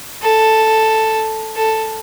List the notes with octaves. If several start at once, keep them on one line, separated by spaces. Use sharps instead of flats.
A4
A4